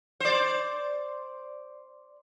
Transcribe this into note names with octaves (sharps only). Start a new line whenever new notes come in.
C5 D5